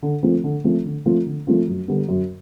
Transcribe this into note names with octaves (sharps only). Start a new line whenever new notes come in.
D3
F3 A3 C4 F4
D3
F3 A3 C4 F4
D3
F3 A3 C4 F4
D3
F3 A3 C4 F4
F#2
D3 G3 B3
F#2